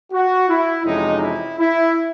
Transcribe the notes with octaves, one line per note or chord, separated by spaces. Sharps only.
F#4
E4
F2 C3 E3 G#3 C#4 D#4
E4
E4